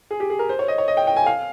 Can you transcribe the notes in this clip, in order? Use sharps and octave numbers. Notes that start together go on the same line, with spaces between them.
G#4
G4
G#4
A#4
C5
C#5
D#5
C#5
D#5
G5
G5
G#5
F5